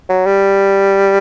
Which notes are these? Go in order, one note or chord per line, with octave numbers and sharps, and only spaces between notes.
F#3
G3